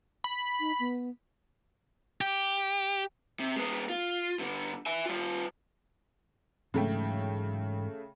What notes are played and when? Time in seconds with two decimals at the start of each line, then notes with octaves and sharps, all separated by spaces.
0.24 B5
0.60 D#4
0.79 B3
2.21 G4
3.40 C3
3.56 G#3 B3
3.89 F4
4.39 G2 D3
4.86 E5 G#5
5.06 G3 F4
6.74 G#2 C#3 E3 F#3 A3 G5